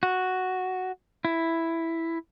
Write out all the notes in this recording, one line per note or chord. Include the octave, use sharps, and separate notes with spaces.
F#4
E4